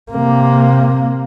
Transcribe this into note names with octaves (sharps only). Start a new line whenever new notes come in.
C3 A#3